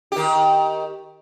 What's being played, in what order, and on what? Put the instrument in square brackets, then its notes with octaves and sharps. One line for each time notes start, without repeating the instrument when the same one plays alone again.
[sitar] D#3 G4